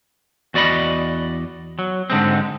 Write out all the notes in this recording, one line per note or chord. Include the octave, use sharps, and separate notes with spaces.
E2 F#4 D5 D#5 B5
F#3
G#2 D3 G#3 C4